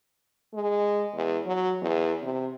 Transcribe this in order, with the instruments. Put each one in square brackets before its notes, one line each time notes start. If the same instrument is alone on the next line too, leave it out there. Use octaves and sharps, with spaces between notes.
[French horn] G#3
E2
F#3
E2
C3